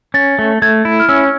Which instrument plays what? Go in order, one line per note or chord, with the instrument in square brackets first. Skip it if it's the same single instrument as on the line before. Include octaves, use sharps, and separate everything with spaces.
[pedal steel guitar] C#4 [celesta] A6
[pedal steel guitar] A3
[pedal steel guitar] A3 [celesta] G#6
[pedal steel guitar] E4
[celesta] F6
[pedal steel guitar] C#4 [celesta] E6